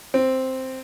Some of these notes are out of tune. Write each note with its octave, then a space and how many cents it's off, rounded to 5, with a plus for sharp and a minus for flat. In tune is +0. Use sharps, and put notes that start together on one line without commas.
C4 +0